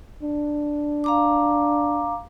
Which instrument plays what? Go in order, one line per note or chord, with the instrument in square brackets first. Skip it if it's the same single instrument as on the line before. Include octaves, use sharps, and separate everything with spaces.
[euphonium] D4
[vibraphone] F5 A#5 D6